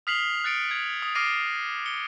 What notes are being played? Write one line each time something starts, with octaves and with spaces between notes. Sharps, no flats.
D#6 F6 B6 C7 F7 F#7
F#6 A6 C#7 D7
G#6
D#6
D6 F6 A#6 C7 D7 D#7
C#7 G7